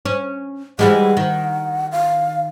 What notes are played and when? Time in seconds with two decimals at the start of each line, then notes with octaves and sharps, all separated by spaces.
0.05 C#4
0.79 E3 G3 G#3 F#5
1.17 D#3
1.92 F5